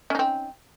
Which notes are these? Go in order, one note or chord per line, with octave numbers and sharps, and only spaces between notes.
C4 C#4 D#4